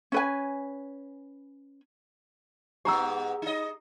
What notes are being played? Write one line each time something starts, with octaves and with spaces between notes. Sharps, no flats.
C#4 B4 G#5
G#2 B3 G4 A#5 E6
D#4 D#5